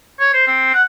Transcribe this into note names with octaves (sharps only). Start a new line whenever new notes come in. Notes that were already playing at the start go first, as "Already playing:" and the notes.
C#5
C5
C4
F#5